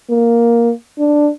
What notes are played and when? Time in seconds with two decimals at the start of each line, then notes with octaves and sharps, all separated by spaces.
0.10 A#3
0.99 D4